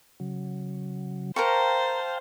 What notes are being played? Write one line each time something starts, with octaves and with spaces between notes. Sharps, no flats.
C#3 F#3
A#4 C5 F5 G5 A5 A#5 C#6